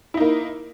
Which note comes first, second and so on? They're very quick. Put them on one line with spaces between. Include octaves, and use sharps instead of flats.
E4 D#4 A#3